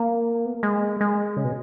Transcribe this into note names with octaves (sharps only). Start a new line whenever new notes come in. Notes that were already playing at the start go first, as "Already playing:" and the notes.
Already playing: A#3
B3
A#3
G#3
G#3
C#3
B2